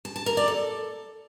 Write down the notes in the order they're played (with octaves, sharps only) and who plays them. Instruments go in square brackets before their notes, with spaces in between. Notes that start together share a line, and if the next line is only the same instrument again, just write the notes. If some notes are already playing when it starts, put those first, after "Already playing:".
[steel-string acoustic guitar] A5
A5
A#4
D5
A4